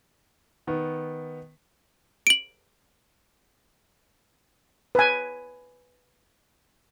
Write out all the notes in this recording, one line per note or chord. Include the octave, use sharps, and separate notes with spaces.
D#3 B3
D7 F#7
B4 G#5